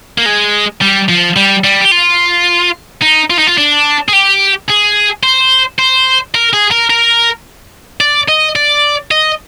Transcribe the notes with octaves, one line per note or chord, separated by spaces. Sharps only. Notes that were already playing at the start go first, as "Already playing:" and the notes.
A#3
G#3
G3
F3
G3
G3
G4
F4
D#4
F4
D#4
F4
D4
G#4
G4
G#4
C5
C5
A#4
G#4
A#4
A#4
D5
D#5
D5
D#5